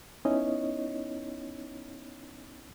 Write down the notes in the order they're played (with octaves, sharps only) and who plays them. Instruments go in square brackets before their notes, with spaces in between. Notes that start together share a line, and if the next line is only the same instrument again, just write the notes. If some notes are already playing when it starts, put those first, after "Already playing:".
[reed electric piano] B3 C#4 D#4 E4 C#5 D#5